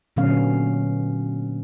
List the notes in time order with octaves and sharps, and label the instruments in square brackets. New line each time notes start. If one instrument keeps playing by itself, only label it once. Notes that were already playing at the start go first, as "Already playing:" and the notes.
[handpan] A#2 D3 F#3 B3 C#4 F5